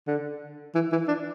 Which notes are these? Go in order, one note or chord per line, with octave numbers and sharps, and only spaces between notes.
D3
E3
E3
D4